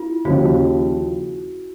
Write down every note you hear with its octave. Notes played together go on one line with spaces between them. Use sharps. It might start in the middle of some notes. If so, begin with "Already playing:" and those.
Already playing: E4 F4
D#2 C#3 F3 F#4